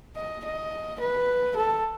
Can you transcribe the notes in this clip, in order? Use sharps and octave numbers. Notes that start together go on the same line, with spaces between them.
D#5
D#5
B4
A4